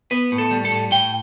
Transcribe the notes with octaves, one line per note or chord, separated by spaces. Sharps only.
B3 B4
A2
A4
G3
A4
A2
A2 G5